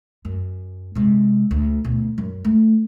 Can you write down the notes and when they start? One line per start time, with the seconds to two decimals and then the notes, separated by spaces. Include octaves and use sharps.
0.25 F#2
0.95 C3 G#3
1.51 D2
1.84 D2 B2
2.18 F#2
2.45 A3